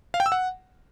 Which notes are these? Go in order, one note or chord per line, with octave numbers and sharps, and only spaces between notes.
F5
G5
E6
F#5